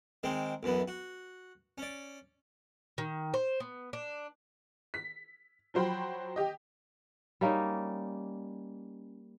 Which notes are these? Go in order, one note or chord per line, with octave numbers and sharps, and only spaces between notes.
D#3 G#3 C4
B1 F#2 E3 B3
F#4
C#4 D5
D#3
C5
B3
D4
B6
F3 F#3 C5 G5 B5
G4 D#5
G3 A#3 C#4 D#4